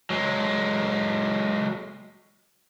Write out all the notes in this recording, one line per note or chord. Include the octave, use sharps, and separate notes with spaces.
F#3 G#3